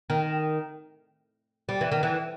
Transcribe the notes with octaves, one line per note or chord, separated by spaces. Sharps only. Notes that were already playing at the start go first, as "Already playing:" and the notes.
D#3
G3
E3
D#3
E3